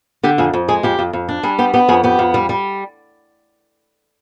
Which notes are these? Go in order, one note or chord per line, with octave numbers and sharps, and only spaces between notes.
D3 G4
F2 G#4
F2
G#3 G#4
F2 G4
F2
F2
D4
G3 G#4
B3 G4
B3 G4
F2 G#4
B3 G4
F2
G3
G3